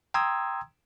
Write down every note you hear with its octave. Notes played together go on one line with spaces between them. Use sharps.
G5 A#5 C6 D#6 E6 G#6